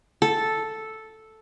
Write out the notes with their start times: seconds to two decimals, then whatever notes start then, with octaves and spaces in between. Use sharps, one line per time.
0.22 A4